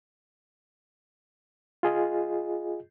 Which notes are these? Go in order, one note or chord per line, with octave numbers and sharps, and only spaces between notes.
F4 G#4 D#5